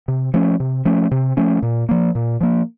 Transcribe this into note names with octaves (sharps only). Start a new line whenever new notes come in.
C3
F3 A3 C#4
C3
F3 A3 C#4
C3
F3 A3 C#4
A#2
F3 A#3
A#2
F3 A#3